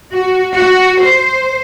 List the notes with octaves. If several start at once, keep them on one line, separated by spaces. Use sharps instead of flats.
F#4
F#4
C5